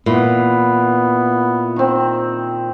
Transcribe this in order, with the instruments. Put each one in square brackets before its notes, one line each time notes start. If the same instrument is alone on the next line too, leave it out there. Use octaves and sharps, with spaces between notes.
[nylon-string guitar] A#2 [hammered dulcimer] E3 [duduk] B3
[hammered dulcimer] D#3 C4